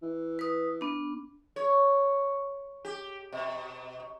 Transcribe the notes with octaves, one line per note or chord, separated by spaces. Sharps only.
E3
B4 D#6
B3 D4
C#5
G4
B2